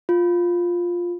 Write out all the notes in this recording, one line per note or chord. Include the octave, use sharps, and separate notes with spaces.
F4